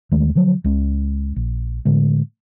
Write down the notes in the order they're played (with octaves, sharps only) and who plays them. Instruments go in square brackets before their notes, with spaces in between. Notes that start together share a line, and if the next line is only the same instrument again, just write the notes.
[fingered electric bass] D#2 D#3 G#3 A3
D3 F3 F#3
C#2 G#3 C#4
A#1
A2 D3 G#3